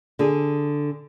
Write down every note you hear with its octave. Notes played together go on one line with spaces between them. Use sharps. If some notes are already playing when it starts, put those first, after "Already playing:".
D3 G#4